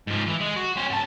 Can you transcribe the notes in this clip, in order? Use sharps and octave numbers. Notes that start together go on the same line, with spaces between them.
G#2 F3
E3
G#3
F#4
C#4 C5
F#2 A5